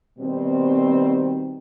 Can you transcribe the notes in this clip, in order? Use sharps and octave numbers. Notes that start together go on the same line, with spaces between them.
B2 D#3 G3 C4